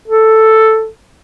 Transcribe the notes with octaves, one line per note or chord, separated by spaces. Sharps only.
A4